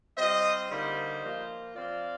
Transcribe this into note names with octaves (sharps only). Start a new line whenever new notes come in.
G3 C4 F4 C5 D#5
D3 G3 A#3 D#4 C5 D#5
F3 A#3 F4
F3 C4 F4 D5 F5